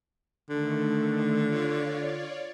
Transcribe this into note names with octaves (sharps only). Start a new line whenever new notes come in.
D3 D#3 A3
F4 C#5 D5